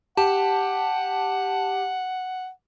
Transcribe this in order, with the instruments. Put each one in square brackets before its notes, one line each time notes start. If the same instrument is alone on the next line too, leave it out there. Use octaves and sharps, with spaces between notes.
[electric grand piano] G4 [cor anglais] F#5 [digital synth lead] A5